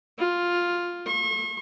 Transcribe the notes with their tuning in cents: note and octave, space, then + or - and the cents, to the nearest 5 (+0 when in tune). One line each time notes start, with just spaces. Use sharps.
F4 +5
C#6 -40